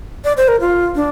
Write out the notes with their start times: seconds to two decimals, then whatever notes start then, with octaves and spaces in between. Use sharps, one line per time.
0.25 D5
0.37 C5
0.48 A#4
0.61 F4
0.95 D4